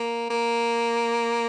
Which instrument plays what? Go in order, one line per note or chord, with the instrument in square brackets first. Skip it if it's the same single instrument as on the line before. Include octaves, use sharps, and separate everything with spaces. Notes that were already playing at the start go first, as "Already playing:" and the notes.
Already playing: [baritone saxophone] A#3
A#3